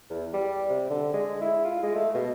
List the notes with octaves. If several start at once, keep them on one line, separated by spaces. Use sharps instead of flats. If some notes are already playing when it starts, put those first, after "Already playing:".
E2
G3
C3
D3
G#3
E4
F4
G#3
A3
B2